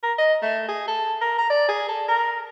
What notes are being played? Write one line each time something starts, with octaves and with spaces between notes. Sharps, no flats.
A#4
D#5
A3
G#4
A4
A#4
A#5
D5
G#4
A4
A#4